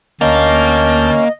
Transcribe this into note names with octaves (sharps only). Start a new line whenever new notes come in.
D2 A#3 C#4 D#5 A5 G6